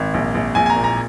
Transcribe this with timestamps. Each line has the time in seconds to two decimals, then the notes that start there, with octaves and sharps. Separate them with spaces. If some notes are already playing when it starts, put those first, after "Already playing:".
Already playing: G#1
0.14 A#1
0.35 A#1
0.55 A#1 G#5
0.66 G#5
0.70 A#5
0.76 A#2
0.84 A#5